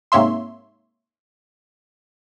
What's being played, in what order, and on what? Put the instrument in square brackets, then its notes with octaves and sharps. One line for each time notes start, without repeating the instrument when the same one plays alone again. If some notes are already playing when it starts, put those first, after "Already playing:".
[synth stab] G#2 C3 A#3 C#5 E5 C6